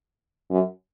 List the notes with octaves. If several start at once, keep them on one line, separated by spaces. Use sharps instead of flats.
F#2